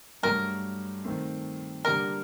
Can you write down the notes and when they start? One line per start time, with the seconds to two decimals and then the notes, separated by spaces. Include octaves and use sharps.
0.23 G2 F#3 A3 A#4
1.04 D#3 A3 C4
1.85 D3 G3 A#3 D4 A#4